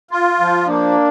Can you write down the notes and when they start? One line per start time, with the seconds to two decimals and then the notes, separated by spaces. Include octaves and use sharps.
0.11 F4
0.40 F3
0.68 A#3 D4